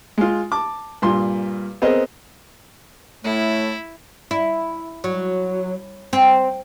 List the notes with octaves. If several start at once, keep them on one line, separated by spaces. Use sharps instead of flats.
G#3 F4
A5 D6
G2 A#2 C6
B3 C4 G#4 A#4 C5 D#5
A2 A3 E4
E4
F#3
C4